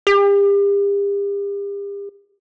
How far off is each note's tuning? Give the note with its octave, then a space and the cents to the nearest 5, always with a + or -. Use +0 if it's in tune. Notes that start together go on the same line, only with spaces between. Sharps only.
G4 +40